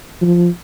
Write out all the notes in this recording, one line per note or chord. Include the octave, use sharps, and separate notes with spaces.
F3